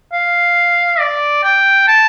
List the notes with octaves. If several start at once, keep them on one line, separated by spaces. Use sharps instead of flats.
F5
D5
G5
A5